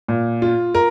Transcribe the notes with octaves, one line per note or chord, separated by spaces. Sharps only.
A#2
F4
A#4